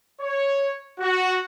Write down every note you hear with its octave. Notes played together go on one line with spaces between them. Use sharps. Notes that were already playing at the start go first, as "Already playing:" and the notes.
C#5
F#4